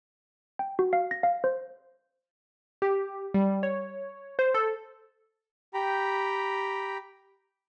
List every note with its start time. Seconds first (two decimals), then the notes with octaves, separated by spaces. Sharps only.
0.59 G5
0.79 F#4
0.93 F5
1.11 A#6
1.23 F5
1.44 C5
2.82 G4
3.34 G3
3.63 C#5
4.39 C5
4.54 A4
5.74 G4 G5 A#5 B5